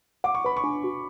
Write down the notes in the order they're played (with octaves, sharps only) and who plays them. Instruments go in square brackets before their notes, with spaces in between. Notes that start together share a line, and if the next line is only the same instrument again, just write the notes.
[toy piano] F#5 [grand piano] D6
[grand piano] C#6
[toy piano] B4 [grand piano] B5
[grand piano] C#6
[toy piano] D4
F#4